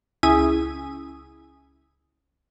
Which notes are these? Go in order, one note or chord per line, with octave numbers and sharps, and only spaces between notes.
C#2 E4 G#5 D#6